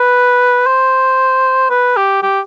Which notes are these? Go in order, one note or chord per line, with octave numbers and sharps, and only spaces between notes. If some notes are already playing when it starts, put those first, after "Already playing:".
Already playing: B4
C5
B4
G4
G4